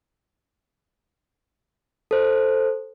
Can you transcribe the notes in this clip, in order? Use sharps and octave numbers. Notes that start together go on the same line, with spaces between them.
A4 C5